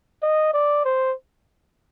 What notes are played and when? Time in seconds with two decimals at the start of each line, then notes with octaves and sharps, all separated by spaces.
0.23 D#5
0.54 D5
0.85 C5